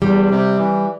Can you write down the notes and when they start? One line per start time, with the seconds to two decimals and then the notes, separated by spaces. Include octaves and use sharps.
0.02 E2 G3
0.30 C3
0.58 E3